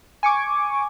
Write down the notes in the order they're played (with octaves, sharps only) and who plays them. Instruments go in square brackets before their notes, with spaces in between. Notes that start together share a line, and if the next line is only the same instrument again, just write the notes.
[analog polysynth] G#5 C#6 D6